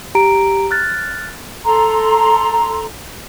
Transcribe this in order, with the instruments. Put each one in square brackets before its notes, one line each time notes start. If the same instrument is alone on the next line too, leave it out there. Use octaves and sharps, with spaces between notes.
[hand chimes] G4 A#5 D7
F6 F#6 A6
[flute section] A4 A#5 C6